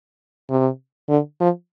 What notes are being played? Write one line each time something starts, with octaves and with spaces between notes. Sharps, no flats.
C3
D3
F3